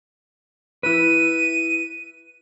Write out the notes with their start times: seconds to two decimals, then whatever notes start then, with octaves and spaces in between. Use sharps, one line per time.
0.83 E4 B4 D#7